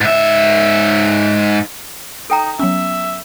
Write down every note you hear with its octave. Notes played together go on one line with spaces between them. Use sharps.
G#2 E5
D#4 A4 G5 A#5
F#3 B3 C#4 E5